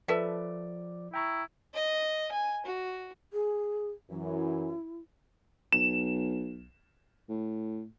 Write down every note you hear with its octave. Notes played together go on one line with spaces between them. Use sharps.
F3 A4 B4 D5 E5 D6
E4 G5 A#5 C#6
D#5
G#5
F#4
G#4
F#2 E3 E4
B1 E7
A2